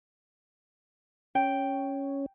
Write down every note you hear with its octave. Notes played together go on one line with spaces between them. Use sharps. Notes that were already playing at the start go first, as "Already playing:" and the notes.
C#4 G5